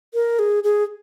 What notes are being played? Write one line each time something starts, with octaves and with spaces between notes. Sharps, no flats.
A#4
G#4
G#4